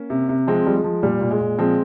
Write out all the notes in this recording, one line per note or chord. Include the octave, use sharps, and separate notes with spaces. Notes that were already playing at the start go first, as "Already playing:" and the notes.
Already playing: A#3 C#4
C3
C3
F3 G#3 C4
F3 G3
G#3
F3
A#2 G3
A#2
G#3
A#2
F3 G#3 C4